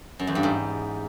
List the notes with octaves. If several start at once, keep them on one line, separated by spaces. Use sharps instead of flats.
F#2
E2
G2
G#2